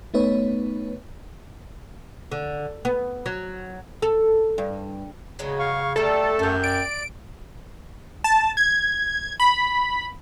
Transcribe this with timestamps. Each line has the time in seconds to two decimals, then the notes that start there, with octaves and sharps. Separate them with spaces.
0.14 A3 B3 D#4 B4 C#5
2.31 D3
2.85 B3
3.26 F#3
4.02 A4
4.58 G2
5.39 C#3 F#3 G#3 B3
5.59 F5 C#6
5.96 D3 G3 A3 A#3 A4
6.39 F#2 F#4 G4
6.64 D5 D7
8.24 A5
8.57 G#6
9.40 B5